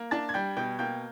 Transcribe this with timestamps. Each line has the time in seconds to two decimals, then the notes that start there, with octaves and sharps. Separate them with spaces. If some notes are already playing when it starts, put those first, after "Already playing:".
Already playing: A#3
0.11 D4 A5 A6
0.29 G#6
0.34 G3 G5 G6
0.57 B2 G5 G6
0.79 A#3 G5 G6